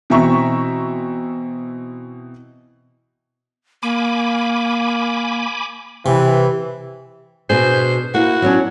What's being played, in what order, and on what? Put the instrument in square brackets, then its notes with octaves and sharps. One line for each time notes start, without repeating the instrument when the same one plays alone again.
[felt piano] B2 E3 C4 E5 A#5 C#6
[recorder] A#3 [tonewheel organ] G#5 B5 D6
[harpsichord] C3 [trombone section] E3
[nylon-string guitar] B2 D4 G#4 [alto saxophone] C5
[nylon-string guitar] A#3 [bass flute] E4 [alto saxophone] F#4
[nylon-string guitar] F#3 C#4 D4